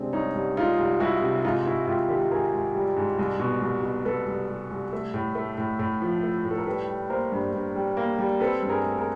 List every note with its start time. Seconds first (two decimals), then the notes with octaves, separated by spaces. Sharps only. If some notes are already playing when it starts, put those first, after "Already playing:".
Already playing: C3 G#3 C4 D4
0.13 C2 C#4 D#4
0.35 C2
0.57 G#3 D#4 F4
0.79 C2
1.00 C2 E4 F#4
1.22 C3
1.44 G#2 D#4 F4
1.66 G#2 E4 F#4
1.87 G#2 F4 G4
2.09 D#3 G4 A4
2.31 G#2 G#4 A#4
2.53 G#2
2.75 G3
2.96 G#2
3.19 C2
3.40 B2
3.62 C2
3.83 B2
4.05 C2 A4 B4
4.27 C2
4.49 C2
4.71 C2
4.93 A3
5.14 A2
5.35 A3
5.58 A2
5.79 A2
6.02 F3
6.23 A3
6.45 A2
6.51 A4
6.58 A#4
6.66 G3 A4 B4
6.88 G3
7.09 A#3 A#4 C5
7.32 G2
7.53 G2
7.75 G3
7.97 A#3
8.19 G3
8.40 C4 A4 B4
8.62 G2
8.69 G#4 A#4
8.83 A3
8.98 G#4 A#4